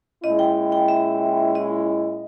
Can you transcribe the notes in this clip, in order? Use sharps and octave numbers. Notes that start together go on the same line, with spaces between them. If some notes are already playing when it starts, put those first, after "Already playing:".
A#2 G#3 C#4 E4 D#5
G5
G5
E5
D#5